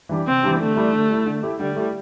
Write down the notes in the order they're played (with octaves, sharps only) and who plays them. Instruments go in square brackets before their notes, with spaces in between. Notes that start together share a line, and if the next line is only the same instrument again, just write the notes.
[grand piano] E3 G3 D4 G4
[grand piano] C3 [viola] C4
[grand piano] E3 G3 D4 G4
[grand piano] D3 [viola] A3
[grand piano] G3 E4
D3
G3 E4
D3
A3 E4 G4
[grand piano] D3 [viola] G3
[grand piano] A3 E4 G4